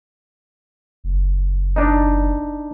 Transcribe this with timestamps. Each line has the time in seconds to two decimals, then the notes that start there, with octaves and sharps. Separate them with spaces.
1.04 F#1
1.76 D4 D#4